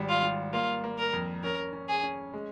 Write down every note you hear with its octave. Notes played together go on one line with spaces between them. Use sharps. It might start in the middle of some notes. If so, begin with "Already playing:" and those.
Already playing: G#1 G3
F4
G3
A#3 F4
A#3
A#4
F2
C#4 A#4
C#4
G#4
C#4
G#3